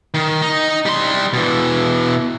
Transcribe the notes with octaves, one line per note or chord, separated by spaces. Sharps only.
D#3
D#4
G3 C6
B2 E3